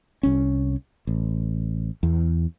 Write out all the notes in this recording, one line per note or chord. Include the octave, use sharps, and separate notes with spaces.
C2 C#4
A1
E2